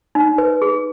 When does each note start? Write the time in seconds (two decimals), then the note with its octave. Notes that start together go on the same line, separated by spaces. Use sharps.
0.15 D#4
0.38 B4
0.62 G#4